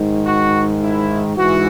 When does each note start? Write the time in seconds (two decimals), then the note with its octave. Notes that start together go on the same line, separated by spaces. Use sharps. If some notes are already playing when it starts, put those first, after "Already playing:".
Already playing: G#2 D#3
0.25 F#4
0.81 E4
1.37 G#2 E3 F#4